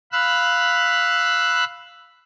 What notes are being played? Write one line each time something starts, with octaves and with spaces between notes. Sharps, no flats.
F5 B5 E6 F#6